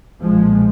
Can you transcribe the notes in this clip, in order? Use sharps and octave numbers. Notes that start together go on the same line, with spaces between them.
B1 A#2 F3 G#3